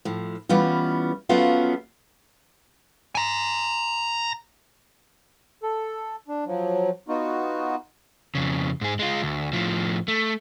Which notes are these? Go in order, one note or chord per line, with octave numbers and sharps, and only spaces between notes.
A2 F3
E3 G3 B3 C#4 F4
F3 F#3 A3 B3 C#4 F4
G#5 A#5
A4
D4
F3 F#3
B3 D#4 F4 F#4
F2 C#3
G#2 G#4
G#3 F4
D2
A2 F3
A3